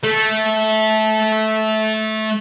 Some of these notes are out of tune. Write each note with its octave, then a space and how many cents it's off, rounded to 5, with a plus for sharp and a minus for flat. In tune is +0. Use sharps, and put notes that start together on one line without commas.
A3 -15